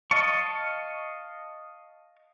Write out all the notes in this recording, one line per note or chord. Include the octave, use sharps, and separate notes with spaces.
D#5 F5 A5 C#6